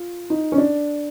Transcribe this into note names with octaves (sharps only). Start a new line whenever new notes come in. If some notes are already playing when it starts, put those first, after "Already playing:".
Already playing: F4
D#4
C#4
D4